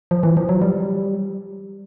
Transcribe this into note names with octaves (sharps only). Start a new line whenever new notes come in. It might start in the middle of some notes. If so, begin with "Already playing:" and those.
F3
E3
F3
F#3
G3